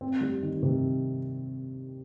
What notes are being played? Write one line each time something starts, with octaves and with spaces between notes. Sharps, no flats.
C4
G3
D#3
C3